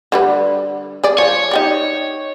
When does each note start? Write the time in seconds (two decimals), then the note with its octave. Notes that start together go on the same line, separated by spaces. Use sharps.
0.12 D3 G3 B4
1.04 G#4 D5
1.18 F3 C#5
1.51 D#4 G4 D5